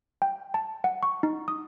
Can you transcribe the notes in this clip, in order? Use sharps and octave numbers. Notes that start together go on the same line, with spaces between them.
G5
A5
F#5
C#6
D#4
D#6